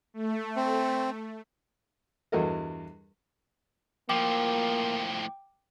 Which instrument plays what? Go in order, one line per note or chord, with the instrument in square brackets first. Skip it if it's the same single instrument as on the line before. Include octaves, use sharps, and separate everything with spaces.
[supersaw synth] A3
[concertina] C4
[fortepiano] E2 G2 F#4 A4 A#4 D#5
[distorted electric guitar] A2 F3 [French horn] A#3 [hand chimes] G5 D6